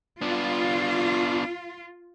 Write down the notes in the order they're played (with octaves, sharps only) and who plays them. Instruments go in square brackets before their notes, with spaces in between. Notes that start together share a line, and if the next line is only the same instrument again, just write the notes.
[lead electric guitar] B3 D4 [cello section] F4